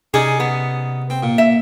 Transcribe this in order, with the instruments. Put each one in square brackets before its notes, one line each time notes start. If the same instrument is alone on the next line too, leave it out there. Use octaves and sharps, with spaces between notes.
[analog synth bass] C3 [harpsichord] C#4 D#4 D5 [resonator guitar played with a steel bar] G#4
[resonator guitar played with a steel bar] B3
[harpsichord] C4
A#2
[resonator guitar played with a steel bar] E5